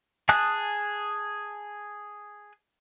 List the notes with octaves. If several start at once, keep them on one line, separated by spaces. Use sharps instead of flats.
G#4 G#5 A5 D#6 F#6